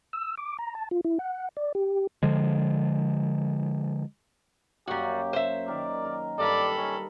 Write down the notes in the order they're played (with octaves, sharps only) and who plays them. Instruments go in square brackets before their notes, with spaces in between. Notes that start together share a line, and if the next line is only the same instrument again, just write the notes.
[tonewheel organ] E6
D6
A#5
A5
F4
E4
F#5
D5
G4
[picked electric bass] D3 F3 G#3
[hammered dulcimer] F#2 A#3 [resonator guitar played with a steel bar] G3 F#4 [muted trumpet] G4
[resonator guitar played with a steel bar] C5 E5
[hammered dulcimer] D#3 A#4 [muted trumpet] D5
[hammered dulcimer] A#4
[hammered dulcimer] G2 A#4 G5 [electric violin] A4 B5 [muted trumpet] D5
[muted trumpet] C#4 [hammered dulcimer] D#5